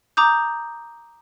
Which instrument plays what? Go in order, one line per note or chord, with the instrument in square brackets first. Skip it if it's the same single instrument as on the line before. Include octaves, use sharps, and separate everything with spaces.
[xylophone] A#5 D6 D#6 G6